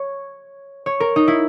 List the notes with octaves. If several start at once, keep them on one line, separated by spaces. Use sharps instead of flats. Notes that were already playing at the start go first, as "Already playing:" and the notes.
Already playing: C#5
C#5
A#4
D#4
E4